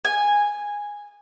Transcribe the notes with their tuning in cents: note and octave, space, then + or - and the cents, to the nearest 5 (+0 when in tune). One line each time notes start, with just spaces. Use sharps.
G#5 -10